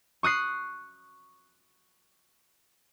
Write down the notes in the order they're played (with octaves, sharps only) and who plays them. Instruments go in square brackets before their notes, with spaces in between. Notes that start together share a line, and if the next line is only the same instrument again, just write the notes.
[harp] C#6 D#6 F#6 C7